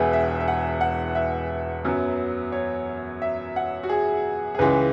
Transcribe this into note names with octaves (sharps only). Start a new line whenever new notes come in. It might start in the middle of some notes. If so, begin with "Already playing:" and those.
Already playing: E1 E2 E3 B3 G#4 B4 E5
E5
E5
F#5
F#5
E5
F#2 F#3 B3
C#5
E5
F#5
F#4
G#4
G#4
C#2 C#3 E3 G#3 B4